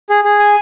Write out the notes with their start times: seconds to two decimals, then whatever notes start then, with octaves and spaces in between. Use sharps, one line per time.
0.10 G#4
0.24 G#4
0.39 G#5